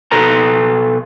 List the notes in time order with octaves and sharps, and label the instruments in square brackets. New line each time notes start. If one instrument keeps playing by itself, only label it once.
[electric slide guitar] B2 A4 B4 A#5